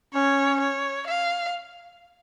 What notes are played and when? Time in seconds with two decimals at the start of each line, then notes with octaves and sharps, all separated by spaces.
0.14 C#4 C#5
0.61 C#5
1.07 F5